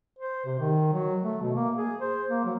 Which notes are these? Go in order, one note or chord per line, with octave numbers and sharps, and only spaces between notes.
C5
C3
D#3
F#3
A3
B2
A#3
G#4
C5
A#3
F#3